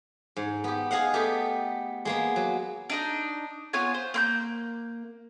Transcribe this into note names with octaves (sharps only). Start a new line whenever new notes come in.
G#2
B3 G4
G#4 D#5 F5 F#5
A3 B3 G4
G#3 A#3 B3
F#3
D4 D#4 D#5
B3 F4 C#5 G#5
C5
A#3 C6 G6